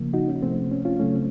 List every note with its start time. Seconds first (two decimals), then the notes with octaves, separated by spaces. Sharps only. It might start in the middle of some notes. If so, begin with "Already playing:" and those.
Already playing: C#3 F3 A#3
0.13 D#4 F#4
0.28 C#4
0.42 C3 F3 A3 C4
0.71 C#4
0.85 C#4 F4
1.00 C#3 F#3 A3 C#4
1.15 C4